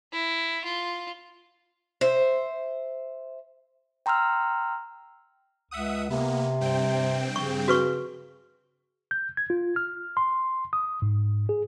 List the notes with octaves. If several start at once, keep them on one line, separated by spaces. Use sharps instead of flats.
E4
F4
C5 E5
G5 A#5 C6 E6 F6
C#2 E5 F#5 D#6
C3 A#3 B3
G2 C4 G5
C#3 C#6
F#4 B4 C#6
G6
G#6
F4
F6
C6
D#6
G#2
G#4